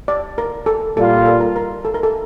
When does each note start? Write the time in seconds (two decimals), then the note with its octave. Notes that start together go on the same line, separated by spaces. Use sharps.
0.08 D5
0.38 A#4
0.66 A4
0.97 A#2 G3 A#3 F4 A4
1.26 A4
1.40 A#4
1.56 A#4
1.85 A4
1.94 A#4
2.03 A4